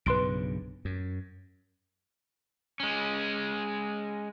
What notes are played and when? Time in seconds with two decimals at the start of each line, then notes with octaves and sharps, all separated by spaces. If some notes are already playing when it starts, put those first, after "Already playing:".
0.06 B1 G2 C#3 B4 C6 D7
0.85 F#2
2.80 G#3 C#4